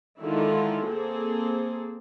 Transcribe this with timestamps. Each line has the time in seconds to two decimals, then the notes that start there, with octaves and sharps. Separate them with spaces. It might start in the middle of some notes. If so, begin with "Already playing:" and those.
0.21 D3 D#3 G#3 E4 F4
0.87 A#3 C4 G#4 A4